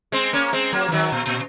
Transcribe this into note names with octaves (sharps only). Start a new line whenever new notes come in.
G#3 C4
A#3 C#4
G#3 C4
F#3 A#3
F3
D#3 F#3
A#2
A#2